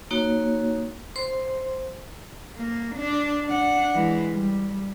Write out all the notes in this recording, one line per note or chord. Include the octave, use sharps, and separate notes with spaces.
A#3 D#4 F#4 C#5
C5 C6
A#3
D4
D4 F#5
E3 G#3
G3